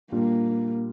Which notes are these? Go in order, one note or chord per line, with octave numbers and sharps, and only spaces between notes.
A#2 G3 A#3 D4 F4